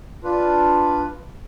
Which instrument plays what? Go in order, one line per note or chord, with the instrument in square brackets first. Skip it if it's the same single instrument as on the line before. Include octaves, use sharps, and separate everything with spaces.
[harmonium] D4 F4 B4